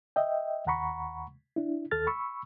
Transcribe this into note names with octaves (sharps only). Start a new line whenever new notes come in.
D#5 E5 G5
D#2 F#5 A#5 B5 C#6
D4 E4
D#2 A4 F6 A6
B5 C#6 E6